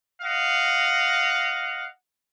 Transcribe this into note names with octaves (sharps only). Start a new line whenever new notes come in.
D#5 F5 F#5